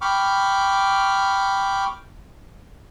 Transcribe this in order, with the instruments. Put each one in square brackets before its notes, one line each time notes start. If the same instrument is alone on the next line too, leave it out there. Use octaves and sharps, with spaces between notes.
[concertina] G5 B5 C#6 D6 F6